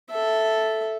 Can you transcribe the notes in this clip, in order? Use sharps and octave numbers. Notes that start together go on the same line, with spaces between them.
A4 E5